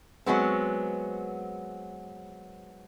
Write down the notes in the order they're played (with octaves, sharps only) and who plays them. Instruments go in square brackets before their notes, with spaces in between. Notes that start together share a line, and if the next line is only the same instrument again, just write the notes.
[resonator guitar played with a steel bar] F#3 G#3 B3 C4